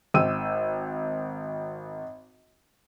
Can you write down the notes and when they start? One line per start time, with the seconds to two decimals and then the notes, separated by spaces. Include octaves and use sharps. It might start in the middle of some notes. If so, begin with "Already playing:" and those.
0.14 G#1 G5 E6 D#7